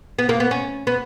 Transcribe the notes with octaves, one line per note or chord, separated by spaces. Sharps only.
B3
A#3
B3
C#4
B3